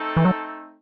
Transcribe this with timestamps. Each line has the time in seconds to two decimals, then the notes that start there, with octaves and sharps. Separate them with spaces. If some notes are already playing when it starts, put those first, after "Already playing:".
Already playing: A3 C4 D#4 A4
0.17 E3
0.25 F#3